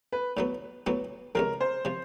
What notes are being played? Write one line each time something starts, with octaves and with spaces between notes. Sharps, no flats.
B4
A2 F#3 B3
A2 F#3 B3
C#2 C3 F3 A#4
C5
C3 F3